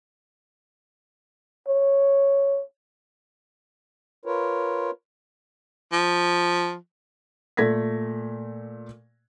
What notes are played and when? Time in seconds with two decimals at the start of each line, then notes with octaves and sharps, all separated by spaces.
1.68 C#5
4.25 F4 A#4 B4 C#5
5.92 F3
7.57 A#2 A3 G#6 A#6 B6